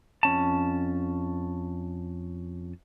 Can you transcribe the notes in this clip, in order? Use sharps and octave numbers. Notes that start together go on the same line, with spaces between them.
F2 C#4 A5